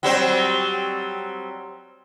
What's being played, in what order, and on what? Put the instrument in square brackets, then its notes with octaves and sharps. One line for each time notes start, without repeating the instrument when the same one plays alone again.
[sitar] F#3 G3 C4